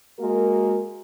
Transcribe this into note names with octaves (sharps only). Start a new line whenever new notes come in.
G#3 A#3 F#4 A#4